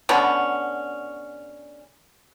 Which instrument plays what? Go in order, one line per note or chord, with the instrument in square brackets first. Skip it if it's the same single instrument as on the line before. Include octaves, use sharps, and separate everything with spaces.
[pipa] B2 D3 C#4 B5